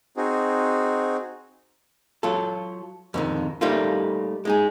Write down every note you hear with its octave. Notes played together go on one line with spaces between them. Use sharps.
C4 D#4 F#4 G#4
F#3 F4 A4
F2 D3 D#3
G3 A3 A#3 D#4 F4
G#3 D#4 G#4